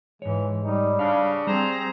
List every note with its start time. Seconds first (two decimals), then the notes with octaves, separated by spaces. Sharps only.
0.22 G#2 E3 G#3 C#5
0.64 G3 D#4
0.99 C#3 D4 F5
1.47 G3 C4 G#4 C5 A#5